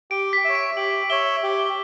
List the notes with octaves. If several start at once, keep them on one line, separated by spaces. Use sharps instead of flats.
G4 D7
B6
C#5 E5
D7
G4 F#7
C#5 E5 G7
G4